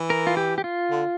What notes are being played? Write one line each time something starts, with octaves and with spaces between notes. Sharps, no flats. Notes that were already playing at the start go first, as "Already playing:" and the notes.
Already playing: E3
A#4
F4
G4
G4
F4
D3